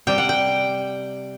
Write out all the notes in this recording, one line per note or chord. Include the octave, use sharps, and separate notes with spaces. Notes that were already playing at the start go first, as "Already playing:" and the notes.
C3 G3 G5
F#5
G5